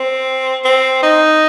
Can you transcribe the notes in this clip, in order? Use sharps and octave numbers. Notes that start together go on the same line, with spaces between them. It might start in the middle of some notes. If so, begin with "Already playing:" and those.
Already playing: C4
C4
D#4